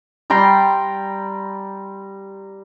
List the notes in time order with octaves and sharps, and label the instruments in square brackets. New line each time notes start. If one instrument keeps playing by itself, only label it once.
[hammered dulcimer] G3 G5 A#5 C6